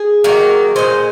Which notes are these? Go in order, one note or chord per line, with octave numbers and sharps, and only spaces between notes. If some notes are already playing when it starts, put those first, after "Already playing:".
Already playing: G#4
D#3 F#3 A#3
A#2 G#3 C5